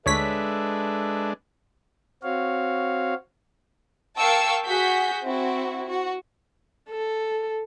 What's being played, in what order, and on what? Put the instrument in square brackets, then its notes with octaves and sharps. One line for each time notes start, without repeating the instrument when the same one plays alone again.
[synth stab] D2 C#5 B6 [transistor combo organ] G#3 D4 [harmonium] A4 B4 E5
[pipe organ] C4 F#4 C#5 F5
[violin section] A#4 F5 G5 A5 C#6 E6
F#4 G#4 G6 B6
C4 E4 F#4
F#4
[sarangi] A4